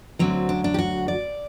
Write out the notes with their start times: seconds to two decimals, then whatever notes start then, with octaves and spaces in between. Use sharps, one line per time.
0.19 D2 D3 F#3 C4
0.49 D4
0.64 D4
0.74 G4
0.79 F#4
1.08 D5